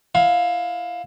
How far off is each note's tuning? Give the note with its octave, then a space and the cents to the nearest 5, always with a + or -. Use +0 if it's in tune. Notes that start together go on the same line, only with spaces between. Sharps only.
E4 +20 F5 +20